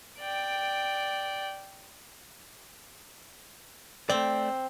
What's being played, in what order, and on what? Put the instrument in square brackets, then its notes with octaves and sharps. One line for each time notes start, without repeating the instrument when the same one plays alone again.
[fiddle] D5 G5
[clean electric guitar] A3 D5 [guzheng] C4